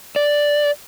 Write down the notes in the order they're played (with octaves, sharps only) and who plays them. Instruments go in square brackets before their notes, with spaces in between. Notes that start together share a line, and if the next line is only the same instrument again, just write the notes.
[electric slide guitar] D5